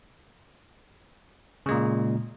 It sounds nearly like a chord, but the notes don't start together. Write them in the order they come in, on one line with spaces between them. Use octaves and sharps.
C#3 G#3 A#2